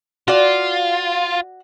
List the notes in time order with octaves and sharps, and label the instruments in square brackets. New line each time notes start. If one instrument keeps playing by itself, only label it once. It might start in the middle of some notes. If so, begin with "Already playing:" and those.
[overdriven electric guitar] F4 [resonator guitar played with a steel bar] F#4 D5